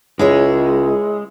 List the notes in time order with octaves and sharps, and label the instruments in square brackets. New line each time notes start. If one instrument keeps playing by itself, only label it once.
[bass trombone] C#2 [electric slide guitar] G#3 [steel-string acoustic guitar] E4 G#4 C#5